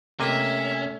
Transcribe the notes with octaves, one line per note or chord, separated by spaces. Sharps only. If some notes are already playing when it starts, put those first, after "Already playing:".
C3 A3 A#3 C#4 D#5 E5